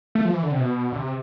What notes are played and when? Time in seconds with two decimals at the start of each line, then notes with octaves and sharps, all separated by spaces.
0.15 A3
0.25 F3
0.34 E3
0.43 D3
0.52 C3
0.60 B2
0.92 D3
0.97 C3